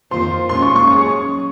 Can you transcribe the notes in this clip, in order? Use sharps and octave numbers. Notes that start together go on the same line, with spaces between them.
F2 D#3 A#3 F4 C5 C6
A#2 G#3 C#4 F4 C6
C#6
C#6
F#3 C#4 G#4 C#5 C#6